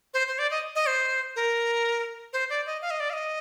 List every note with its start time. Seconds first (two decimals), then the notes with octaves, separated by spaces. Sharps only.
0.14 C5
0.28 C5
0.39 D5
0.51 D#5
0.75 D#5
0.86 C5
1.36 A#4
2.33 C5
2.50 D5
2.66 D#5
2.82 F5
2.91 D#5
3.00 D5
3.10 F5
3.13 D#5